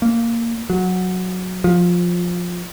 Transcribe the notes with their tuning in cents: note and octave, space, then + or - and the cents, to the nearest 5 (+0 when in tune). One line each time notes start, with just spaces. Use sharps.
A#3 -10
F#3 -10
F3 +15